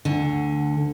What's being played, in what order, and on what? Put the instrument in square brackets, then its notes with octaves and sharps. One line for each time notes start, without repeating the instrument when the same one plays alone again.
[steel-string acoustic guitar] D2 D3